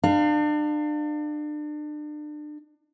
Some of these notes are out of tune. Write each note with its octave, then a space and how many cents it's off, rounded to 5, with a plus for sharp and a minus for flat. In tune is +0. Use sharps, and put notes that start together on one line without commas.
D4 +35 F5 +0